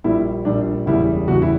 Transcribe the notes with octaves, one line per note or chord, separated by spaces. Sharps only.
A#1 A#2 G3 E4
A#1 A#2 G3 D4
F#1 E2 C#3 G3 E4
F#1 E2 C#3 G3 F#4
E4